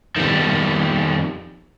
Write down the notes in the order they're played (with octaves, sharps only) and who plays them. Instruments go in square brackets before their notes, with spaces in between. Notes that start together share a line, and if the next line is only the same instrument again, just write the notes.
[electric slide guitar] F2 F3 B3 [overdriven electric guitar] D#3 G3